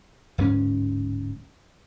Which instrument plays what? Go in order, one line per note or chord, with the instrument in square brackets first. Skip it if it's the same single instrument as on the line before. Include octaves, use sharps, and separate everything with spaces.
[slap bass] D1 G#2 C#4